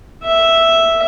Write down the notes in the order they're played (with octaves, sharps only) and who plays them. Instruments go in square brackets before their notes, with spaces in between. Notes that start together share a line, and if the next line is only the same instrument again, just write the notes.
[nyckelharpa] E5